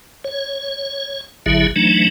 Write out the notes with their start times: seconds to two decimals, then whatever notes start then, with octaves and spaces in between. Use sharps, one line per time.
0.24 C#5
1.46 A1 D3 F#3 E4 G#4 E5
1.76 E3 F#3 A3 D4 D#4